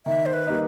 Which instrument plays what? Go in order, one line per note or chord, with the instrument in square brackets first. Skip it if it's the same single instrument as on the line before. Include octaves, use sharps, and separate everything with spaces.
[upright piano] D#3 [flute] E5
[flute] C5
B4
[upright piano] G3 A#3 D#4